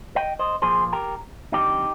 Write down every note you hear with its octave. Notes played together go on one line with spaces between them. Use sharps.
D#5 G5
C5 D#5
A#2 F3 A#3 G#4 C5
G4 A#4
F2 D3 G3 C4 D#4 G4